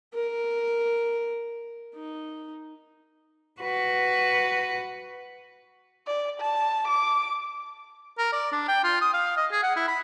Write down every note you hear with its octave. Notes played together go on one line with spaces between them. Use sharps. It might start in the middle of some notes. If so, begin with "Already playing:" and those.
A#4
D#4
F#4 B4
D5
A5
D6
A#4
D5
D4
G5
F4
D#6
F5
D#5
G#4
F#5
E4
B5